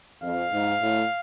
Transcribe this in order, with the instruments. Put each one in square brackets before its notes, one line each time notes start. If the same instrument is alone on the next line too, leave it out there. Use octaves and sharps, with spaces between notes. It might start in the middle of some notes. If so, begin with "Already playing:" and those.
[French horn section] F2 [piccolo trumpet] F5
[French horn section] G#2
A2